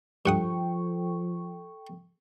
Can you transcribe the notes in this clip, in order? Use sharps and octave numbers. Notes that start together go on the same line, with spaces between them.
G2 F3 A4 F#5 G5 C#6 D#6